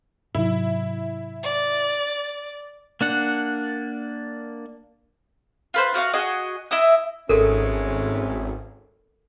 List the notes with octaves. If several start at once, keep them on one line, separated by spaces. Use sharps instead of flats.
G#2 C3 F#3 E4
D5
A#3 D4 F#5
F4 B4 C5
F4 F#4 D5 F5
F#4 G#4 D#5
E4 D#5 E5 D#6
G#1 G#3 A3 C#4 A4 A#4